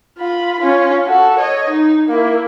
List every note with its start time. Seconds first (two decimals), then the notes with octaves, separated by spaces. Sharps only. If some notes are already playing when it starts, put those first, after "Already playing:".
0.18 F4 B5
0.60 C#4 F4
1.07 F#4 A4
1.39 C#5 D#5
1.70 D#4
2.09 A#3 E4